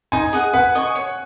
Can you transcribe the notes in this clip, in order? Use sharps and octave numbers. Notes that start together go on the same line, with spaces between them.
D#4 G#5
G#4 D#5 F#5
B4 F#5
D#5 G#5 C#6
C#5